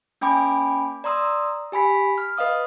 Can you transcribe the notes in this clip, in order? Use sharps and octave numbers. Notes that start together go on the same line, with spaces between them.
A#3 C#4 G5 G#5 B5 D6
D5 A#5 C6 D#6 E6
G4 G#5 B5 B6
F6
B4 D#5 F5 D#6